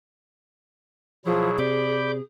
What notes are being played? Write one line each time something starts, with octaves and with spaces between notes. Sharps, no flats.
B2 F3 F#3 E4 G#4
C3 D5 B5 D6 G6